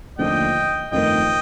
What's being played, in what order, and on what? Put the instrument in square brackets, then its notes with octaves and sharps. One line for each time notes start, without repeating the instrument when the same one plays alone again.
[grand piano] D#2 D3 F3 A3 D4 [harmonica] D#5 G5
[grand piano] G1 F2 D#3 A3 [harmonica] D#5 G5